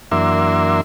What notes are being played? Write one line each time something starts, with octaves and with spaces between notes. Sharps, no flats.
F#2 E3 A#3 D4 E5 C6